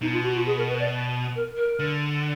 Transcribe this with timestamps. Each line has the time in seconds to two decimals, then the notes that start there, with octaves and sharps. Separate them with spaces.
0.01 B2 D#4
0.13 F4
0.24 F#4
0.35 F4
0.46 G#4
0.57 A#4
0.69 B4
0.79 D5
1.36 A#4
1.57 A#4
1.79 D3